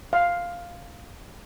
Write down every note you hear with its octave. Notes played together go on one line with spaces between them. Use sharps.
F5